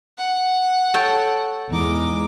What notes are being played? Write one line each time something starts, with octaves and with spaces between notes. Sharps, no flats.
F#5
A4 C#5 G5
E2 G#3 D#4 D6